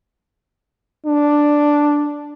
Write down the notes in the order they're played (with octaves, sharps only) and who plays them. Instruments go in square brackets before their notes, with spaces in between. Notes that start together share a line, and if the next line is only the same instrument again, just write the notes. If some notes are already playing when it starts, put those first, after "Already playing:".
[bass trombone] D4